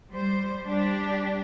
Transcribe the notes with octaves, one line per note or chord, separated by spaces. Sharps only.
G3 C5
G3 D4 G4